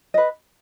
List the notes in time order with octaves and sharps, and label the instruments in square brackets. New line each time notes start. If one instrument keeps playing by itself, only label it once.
[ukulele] B4 D#5